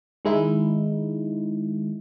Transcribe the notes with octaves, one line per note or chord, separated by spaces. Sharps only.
D#3 G#3 D#4 E4